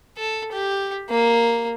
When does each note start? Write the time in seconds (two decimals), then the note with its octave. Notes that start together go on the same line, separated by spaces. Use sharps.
0.18 A4
0.53 G4
1.10 A#3